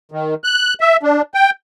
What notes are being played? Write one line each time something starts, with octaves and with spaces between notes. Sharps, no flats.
D#3
F#6
E5
D4
G5